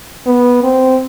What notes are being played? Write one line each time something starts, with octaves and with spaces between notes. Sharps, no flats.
B3
C4